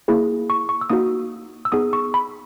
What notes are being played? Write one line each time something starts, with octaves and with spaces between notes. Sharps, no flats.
A#3 E4 G#4
C#6
C#6
E6
A#3 D#4 F#4 D#6
E6
B3 D#4 G#4 D#6
C#6
B5